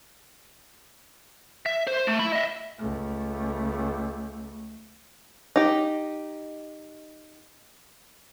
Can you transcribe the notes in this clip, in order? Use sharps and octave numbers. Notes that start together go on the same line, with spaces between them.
E5
C5
A3
E5 B5
D#5 E5
C#2 A3
D#4 G4